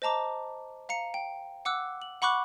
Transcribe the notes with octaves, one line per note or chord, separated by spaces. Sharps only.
C5 D#5 A5 A#5 D6
F5 A#5 C#7
G5
F#5 D6 E6 F#6
F#7
F#5 B5 C#6 D6 F#6